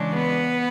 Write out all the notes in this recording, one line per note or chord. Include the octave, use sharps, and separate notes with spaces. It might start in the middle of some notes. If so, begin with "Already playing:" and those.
Already playing: C#3 E3 G#3 D4
B3 B4